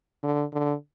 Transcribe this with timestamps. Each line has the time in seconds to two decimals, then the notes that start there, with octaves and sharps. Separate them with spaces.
0.23 D3
0.53 D3